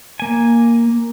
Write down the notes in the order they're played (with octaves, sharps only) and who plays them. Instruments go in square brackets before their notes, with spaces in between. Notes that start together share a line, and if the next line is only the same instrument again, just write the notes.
[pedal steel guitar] A#3 G#5